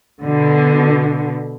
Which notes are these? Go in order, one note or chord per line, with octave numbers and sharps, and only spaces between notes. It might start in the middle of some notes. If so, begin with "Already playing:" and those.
B2 D3